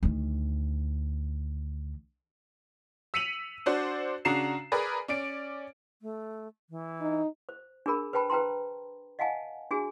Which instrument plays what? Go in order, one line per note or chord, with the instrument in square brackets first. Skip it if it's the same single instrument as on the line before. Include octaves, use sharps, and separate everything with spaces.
[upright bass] D2 D#3
[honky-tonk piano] E6 B6 C#7 D#7 F7 F#7
D4 F#4 C5 D5
C#3 D4 F#4 A#5 C7 E7
G#4 A#4 B4 D5
C#4 D5 D7
[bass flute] A3
E3
[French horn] D#4
[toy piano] C5
D4 G#4 A#4 B5
B4 C5 G5 A5 B5
B4 C5 G5 A5 A#5 C6
D#5 F5 F#5 G#5 A5
D4 F#4 G#4 G#5